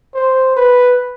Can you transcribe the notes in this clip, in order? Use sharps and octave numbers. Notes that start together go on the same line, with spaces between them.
C5
B4